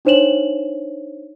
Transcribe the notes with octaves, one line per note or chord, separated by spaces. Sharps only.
D4 D#4 C5 C#5 E7 F#7